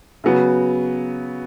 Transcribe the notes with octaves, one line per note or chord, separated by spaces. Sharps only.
C#3 F#3 B3